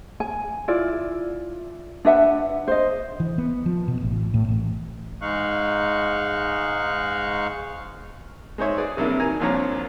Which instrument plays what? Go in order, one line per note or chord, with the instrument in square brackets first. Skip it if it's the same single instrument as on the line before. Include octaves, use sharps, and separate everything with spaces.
[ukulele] G#5
E4 F4 D5
D4 B4 E5 F#5
C5 D#5
[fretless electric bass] E3
B3
F3
B2
A1
A2
A1
[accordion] G#2 G#3 D#4 F5 C#6 F#6
[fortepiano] G#3 D#4 C5 C#5 E5
G#4 B4 D5
C3 F#3 G3 A#3 D4 E4
D#3 G#5 A#5
C2 A#2 F3 D4 C#5 A#5